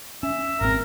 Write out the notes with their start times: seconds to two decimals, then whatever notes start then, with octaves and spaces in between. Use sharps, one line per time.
0.23 C#4 E5 E6
0.61 G#1 C4 A#4